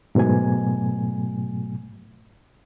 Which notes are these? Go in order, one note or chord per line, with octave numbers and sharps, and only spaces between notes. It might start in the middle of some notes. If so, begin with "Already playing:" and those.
G#2 B2 F#3 A3 G#5